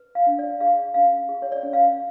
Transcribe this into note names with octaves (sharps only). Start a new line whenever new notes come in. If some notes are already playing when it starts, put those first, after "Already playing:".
Already playing: B4
F5
D4
D5
G#4 F5
C#4 F5
G#4
C#5
D5
C#4
F5